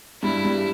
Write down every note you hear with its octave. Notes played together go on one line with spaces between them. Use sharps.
G2 G3 E4
G2 G3